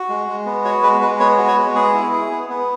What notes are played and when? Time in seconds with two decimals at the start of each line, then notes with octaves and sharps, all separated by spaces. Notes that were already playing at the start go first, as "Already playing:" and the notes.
Already playing: F#4
0.09 G#3
0.28 G#3
0.46 B3
0.65 F#4 C#5
0.82 G#3 B4
1.01 G#3 B4
1.20 B3 C#5
1.38 F#4
1.48 C#5
1.56 G#3
1.75 B3 G#4
1.94 E4
2.12 G#4
2.31 B3
2.49 B3